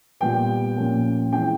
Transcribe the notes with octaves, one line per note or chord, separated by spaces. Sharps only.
A#2 G3 B3 G5
A#2 F3 A#3 C#4
E3 G#3 C4 G5